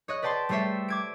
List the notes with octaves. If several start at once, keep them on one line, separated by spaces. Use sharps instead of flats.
C#5 D#5 F#6
B4 D5 G5 A5 C6
G3 A3 C5 C#5 E5
D6 G#6 D7